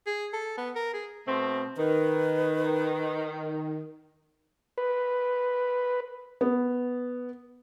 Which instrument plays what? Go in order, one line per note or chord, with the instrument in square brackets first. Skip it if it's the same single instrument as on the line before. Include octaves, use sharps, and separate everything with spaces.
[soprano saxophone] G#4
A4
B3
A#4
G#4
[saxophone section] B2 A3 C4
[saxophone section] D#3 [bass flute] B4
[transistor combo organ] B4
[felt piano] B3